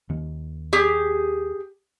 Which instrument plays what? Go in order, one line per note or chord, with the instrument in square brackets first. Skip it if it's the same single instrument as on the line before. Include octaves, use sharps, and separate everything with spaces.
[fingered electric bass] D#2 D#3 C#4
[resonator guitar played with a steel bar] G4 G#4